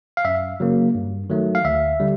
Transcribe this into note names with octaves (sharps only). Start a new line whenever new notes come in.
F5
F#2 E5
C#3 F#3 A#3
G2
D#3 F#3 A3
F5
D2 E5
D3 G3